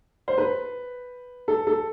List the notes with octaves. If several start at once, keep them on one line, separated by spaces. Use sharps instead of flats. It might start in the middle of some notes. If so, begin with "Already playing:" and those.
C5
B4
A4
A4